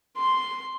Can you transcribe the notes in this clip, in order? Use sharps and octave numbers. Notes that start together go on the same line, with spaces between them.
C6